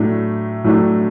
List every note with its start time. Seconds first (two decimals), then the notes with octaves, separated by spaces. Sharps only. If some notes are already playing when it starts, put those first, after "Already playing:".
Already playing: A2 F#3 A3 D4
0.64 A2 F#3 A3 D4